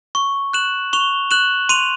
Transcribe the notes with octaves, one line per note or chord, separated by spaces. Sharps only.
C#6
F#6 E7 F#7
C#6 F7 G7
F#6 E7 F#7
C6 D#7 F7